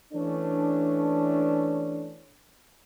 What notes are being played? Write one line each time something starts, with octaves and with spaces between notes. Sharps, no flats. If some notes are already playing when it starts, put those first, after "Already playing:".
E3 A3 C#4 D4